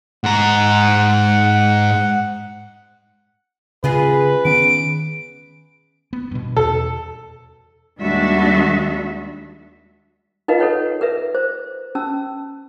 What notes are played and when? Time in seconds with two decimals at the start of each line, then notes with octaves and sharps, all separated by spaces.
0.24 G#2 F#5 A#5
3.84 C#3 G#3 F4 G#4 B4
4.45 D#3 B3 C#4 D7
6.13 B3
6.31 G2 B2
6.57 E2 B2 A4
7.99 D#2 G3 G#3 D4 F#4 E5
10.48 D#4 F4 A#4 B4 D#5 F5
10.60 A4 B4 C#5 F#5
11.01 A#4 B4 E5
11.35 C5
11.95 C#4 A5 E6